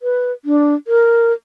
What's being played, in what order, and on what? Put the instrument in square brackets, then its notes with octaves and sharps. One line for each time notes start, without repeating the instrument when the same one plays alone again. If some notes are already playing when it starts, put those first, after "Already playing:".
[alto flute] B4
D4
A#4